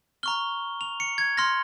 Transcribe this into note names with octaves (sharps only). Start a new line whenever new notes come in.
A#5 C#6 F6 G7
F7
C#7
G#6
C6 F6 A#6